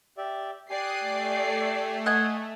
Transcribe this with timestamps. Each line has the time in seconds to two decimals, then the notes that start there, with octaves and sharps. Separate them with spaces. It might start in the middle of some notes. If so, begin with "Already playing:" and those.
0.17 G4 D5 E5
0.70 G4 D5 G#5 D#6 F#6 C7 D#7
1.00 A3
2.06 D#5 F#5 G#5